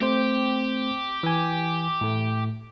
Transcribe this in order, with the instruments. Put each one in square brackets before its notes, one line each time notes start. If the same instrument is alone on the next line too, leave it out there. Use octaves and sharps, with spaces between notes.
[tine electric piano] A3 C4 C5 [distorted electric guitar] G4
[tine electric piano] E3 G#5
A2 A3